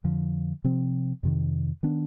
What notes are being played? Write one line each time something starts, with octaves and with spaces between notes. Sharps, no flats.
F2 D3 F3
C3 F3 C4
F2 C3 D#3
D#3 B3 D4